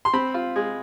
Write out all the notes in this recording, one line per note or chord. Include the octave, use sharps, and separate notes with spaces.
C6
C4 B5
F4
G#3